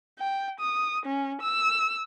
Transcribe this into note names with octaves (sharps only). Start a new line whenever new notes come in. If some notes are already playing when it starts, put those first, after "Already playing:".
G5
D#6
C#4
E6